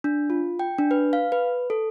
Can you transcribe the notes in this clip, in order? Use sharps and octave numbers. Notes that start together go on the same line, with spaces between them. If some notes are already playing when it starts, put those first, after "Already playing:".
D4
F4
G5
D4
B4
F5
B4
A4